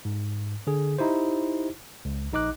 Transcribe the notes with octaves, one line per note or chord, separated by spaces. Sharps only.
G#2
D3 G#4
D#4 E4 G4 C5
C#2
A#1 D#4 D#5 D6 F#6